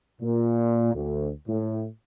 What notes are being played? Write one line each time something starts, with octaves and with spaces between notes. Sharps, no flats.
A#2
D2
A2